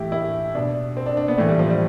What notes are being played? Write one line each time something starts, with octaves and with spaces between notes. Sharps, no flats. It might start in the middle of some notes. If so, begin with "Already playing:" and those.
Already playing: A2 E3 E4 G4
E4
B2 D4
C4
D4
D4
B3
A2 E3 A3
G3
F3
G3